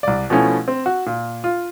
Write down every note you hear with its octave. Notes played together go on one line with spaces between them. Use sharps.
C2 D5
B2 F3 A3 C#4 E4
C4
F#4
A#2
F4